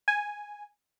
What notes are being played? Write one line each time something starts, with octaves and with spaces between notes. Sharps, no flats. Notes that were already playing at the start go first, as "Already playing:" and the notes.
G#5